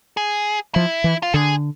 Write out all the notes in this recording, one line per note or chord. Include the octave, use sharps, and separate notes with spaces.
G#4
F3 E4
E3
F4
D3 G#4